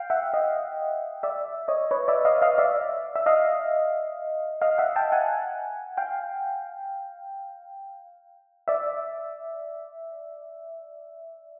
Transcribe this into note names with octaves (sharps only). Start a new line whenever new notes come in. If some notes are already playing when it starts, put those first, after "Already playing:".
Already playing: F5 G5
E5 F#5
D#5 F5
D5 E5
C#5 D#5
B4 C#5
D5 E5
D#5 F5
D#5 F5
D5 E5
E5
D#5 F5
D#5 F5
E5 F#5
G5 A5
F#5 G#5
F5 G5
D5 E5